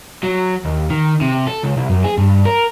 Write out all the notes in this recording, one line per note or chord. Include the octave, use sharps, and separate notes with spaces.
F#3
D#2
D#3
C3
A4
C#2
C2
F#2
G#4
G2
A#4